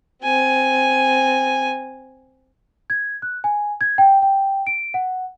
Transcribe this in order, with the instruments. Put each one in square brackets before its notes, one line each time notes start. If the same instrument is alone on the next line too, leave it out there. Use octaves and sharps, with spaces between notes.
[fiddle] C4 G#5
[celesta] G#6
F#6
G#5
G#6
G5
G5
D7
F#5